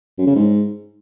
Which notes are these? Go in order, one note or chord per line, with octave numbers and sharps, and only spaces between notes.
F#2
C#3
G#2